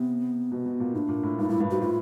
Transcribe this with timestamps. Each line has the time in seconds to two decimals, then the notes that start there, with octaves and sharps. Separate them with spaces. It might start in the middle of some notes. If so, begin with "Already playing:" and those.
Already playing: C3 B3
0.52 B2
0.66 B2
0.80 A#2
0.94 A2 D4 D#4
1.09 A#2
1.23 A2
1.38 G2 D#4
1.49 G2 E4
1.60 G2
1.70 G#2 F#4
1.82 A2 F4